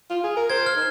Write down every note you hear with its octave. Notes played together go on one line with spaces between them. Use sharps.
F4
G#4
A#4
C5 G#6
F6
D#4